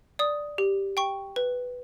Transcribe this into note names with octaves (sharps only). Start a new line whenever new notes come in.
D5 D#6
G4
G5 C#6
B4